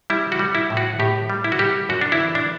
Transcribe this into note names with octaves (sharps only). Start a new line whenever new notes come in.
G3 E4
F#4
G3
E4
A2
F#4
A2 G4
G3
E4
F#4
G3 G4
F#2 F#4
D4
E4
E3
D4